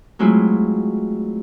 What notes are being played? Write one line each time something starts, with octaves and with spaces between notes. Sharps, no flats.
F#3 G#3 A3 C4 E4 F4